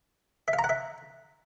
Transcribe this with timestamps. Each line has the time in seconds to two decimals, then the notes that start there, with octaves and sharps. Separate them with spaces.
0.48 E5
0.53 F5
0.59 A#5
0.64 F#5
0.69 E5